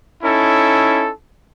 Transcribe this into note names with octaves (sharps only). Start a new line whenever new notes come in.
C#4 D#4 E4 A4